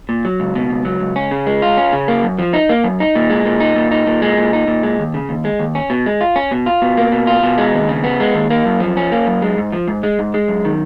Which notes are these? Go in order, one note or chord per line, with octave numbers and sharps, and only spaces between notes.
A#2
F#3
C#2
B2
C#2
F#3
C#2
C#4
C#3
G#3
F4
C#4
C#3
A#3
F#2
F3
D#4
A#3
F#2
D#4
A#2
G#3
A#2
D#4
A#2
D#4
A#2
G#3
A#2
D#4
A#2
G#3
D#2
C#3
D#2
G#3
D#2
C#4
B2
G#3
F4
C#4
B2
F4
B2
A#3
B2
F4
B2
G#3
D#2
C#3
B3
G#3
D#2
A#3
F#2
F3
C#4
A#3
F#2
G#3
G#2
F3
G#2
G#3
G#2
G#3
F#2
D#3